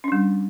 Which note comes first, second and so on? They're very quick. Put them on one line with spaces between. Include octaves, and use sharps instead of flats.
C#4 D4 G3